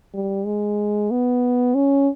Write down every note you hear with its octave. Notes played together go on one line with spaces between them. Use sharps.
G3
G#3
B3
C#4